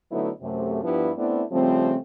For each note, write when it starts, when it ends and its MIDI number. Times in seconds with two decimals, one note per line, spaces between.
0.12 0.30 50
0.12 0.30 54
0.12 0.30 57
0.12 0.30 59
0.12 0.30 63
0.12 0.30 64
0.42 0.83 42
0.42 0.83 48
0.42 0.83 57
0.83 1.11 43
0.83 1.11 53
0.83 1.11 55
0.83 1.11 59
0.83 1.11 62
0.83 1.11 64
1.18 1.43 57
1.18 1.43 59
1.18 1.43 60
1.18 1.43 62
1.18 1.43 64
1.52 1.96 49
1.52 1.96 53
1.52 1.96 55
1.52 1.96 57
1.52 1.96 60